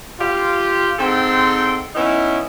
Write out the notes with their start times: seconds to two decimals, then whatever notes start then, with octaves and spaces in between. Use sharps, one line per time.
0.20 F4 G4
0.99 G#2 C4 A4 G5 C6
1.95 B3 C#4 D#4 E4